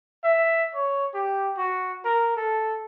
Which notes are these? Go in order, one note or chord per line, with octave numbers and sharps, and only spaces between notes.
E5
C#5
G4
F#4
A#4
A4